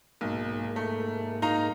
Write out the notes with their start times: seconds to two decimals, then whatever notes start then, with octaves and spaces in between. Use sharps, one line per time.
0.21 B1 G#2 A#3
0.76 A3
1.42 D#4 F5 A#5